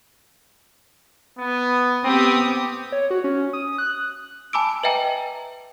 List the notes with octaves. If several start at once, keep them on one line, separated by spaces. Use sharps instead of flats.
B3
B3 C4 G4 D#6
C#5
F#4
C#4
D#6
F#6
G#5 A5 B5 D6 E6 D7
B4 D#5 E5 G5 G#5 A#5